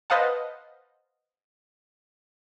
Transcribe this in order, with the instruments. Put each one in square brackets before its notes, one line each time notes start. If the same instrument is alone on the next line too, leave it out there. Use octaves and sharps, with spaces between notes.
[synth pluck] B4 C5 D#5 F5 F#5 A5